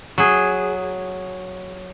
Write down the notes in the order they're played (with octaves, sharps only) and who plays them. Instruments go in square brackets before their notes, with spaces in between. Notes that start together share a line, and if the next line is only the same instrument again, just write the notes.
[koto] F#3 G#4